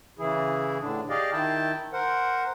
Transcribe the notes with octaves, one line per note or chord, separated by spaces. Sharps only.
C#3 E3 E4 G#4
A2 D3 D4
G4 G#4 D5 D#5 F5
D#3 E4 G5 A5
A#4 C5 F#5